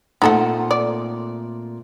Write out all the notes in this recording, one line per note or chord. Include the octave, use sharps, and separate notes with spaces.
A#2 A3 C4 D#4 A4 F#5
D5